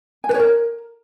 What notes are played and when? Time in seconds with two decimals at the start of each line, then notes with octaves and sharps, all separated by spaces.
0.24 G#5
0.29 B4
0.34 C#5
0.40 A#4